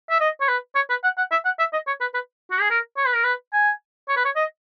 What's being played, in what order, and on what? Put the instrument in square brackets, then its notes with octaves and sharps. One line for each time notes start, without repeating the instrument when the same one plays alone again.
[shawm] E5
D#5
C#5
B4
C#5
B4
F#5
F#5
E5
F#5
E5
D#5
C#5
B4
B4
F#4
G#4
A#4
C#5
B4
A#4
B4
G#5
C#5
B4
C#5
D#5